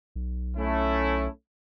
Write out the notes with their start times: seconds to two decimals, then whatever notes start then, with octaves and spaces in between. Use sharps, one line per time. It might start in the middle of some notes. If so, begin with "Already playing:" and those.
0.16 B1
0.57 A3 C#4 E4